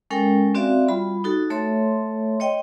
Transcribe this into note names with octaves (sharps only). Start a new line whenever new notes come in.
G#3 C#4 A4 A#4 G5
C4 F#4 D5 E5 F5
G3 F4 B5
D#4 F#4 A4
A3 A4 C#5 E5 C6
C#5 D#5 G5 C6